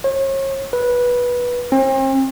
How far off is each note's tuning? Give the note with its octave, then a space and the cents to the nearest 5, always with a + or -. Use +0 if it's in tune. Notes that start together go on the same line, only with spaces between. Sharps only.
C#5 -40
B4 -15
C4 +40